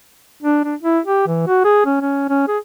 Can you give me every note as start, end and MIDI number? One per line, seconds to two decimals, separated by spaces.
0.43 0.60 62
0.64 0.75 62
0.82 0.99 64
1.05 1.24 67
1.27 1.47 52
1.47 1.62 66
1.65 1.82 68
1.86 1.97 61
2.01 2.28 61
2.29 2.47 61
2.48 2.58 68